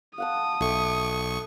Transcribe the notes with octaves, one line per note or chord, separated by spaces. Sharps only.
F5 F#5 A5 D#6
B1 A4 E5 C#6